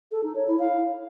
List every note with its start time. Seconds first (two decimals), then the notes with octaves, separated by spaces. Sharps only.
0.12 A4
0.24 D#4
0.35 C#5
0.47 E4
0.59 F5